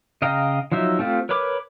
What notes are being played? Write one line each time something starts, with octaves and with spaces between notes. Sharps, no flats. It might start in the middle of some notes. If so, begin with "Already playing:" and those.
C#3 D#5 F5 G5 A#5
F3 F#3 D#4 E5
A3 C4 F4 G4
A#4 B4 C#5 B5 D6